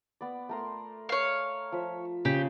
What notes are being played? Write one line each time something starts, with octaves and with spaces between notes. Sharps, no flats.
B3 D5
A3 A#4 C6
C#5 F5
F3 E5
C#3 G4